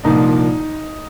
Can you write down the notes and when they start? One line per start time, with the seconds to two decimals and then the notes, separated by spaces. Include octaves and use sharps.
0.04 C2 A#2 F3 A#3 D4 D#4